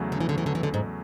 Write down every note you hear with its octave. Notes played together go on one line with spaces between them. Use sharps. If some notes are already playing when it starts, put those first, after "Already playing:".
Already playing: E2 C#3 F#3 A3
D3
E3
D3
E3
D3
E3
D3
G#2